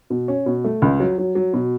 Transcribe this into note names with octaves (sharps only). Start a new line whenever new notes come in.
B2
C#4
B2
A3
C#2
F#3
F#3
F#3
B2